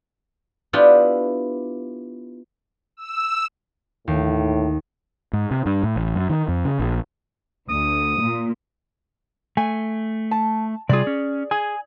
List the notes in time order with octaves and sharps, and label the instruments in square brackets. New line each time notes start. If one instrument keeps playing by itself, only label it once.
[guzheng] B3 D4 E4 F4 G4
[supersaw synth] E6
[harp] D#2 [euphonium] A2
[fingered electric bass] G#2
C3
G2
A2
A1
F#2
D#3
F2
C#3
A#1
[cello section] D2 [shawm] D#6
[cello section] A#2
[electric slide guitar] A3 [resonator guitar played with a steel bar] G#5
[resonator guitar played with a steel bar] A5
[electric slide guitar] C3 G3 F4 [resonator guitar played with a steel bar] G#4 D5
[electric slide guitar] C#4
[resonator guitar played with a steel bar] G#4 [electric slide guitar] G#5